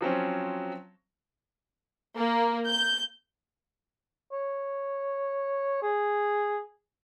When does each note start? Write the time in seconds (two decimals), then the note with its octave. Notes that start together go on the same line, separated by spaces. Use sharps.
0.01 F3 F#3 C4 C#4
2.16 A#3
2.69 G6
4.32 C#5
5.82 G#4